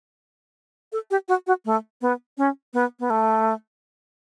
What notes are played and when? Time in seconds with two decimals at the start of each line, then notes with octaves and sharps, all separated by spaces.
0.92 A4
1.11 G4
1.28 F#4
1.47 F#4
1.65 A3
2.02 B3
2.38 C#4
2.74 B3
3.00 B3
3.10 A3